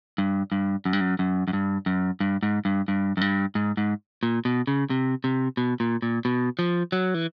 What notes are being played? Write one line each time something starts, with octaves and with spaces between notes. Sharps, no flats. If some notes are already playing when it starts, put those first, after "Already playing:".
G2
G2
F#2
G2
F#2
F#2
F#2
G2
F#2
G2
G#2
G2
G2
F#2
G2
G#2
G#2
A#2
B2
C#3
C3
C3
B2
A#2
A#2
B2
F3
F#3
E3